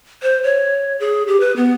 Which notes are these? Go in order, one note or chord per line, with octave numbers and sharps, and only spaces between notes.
C5
C#5
G#4
G4
B4
B3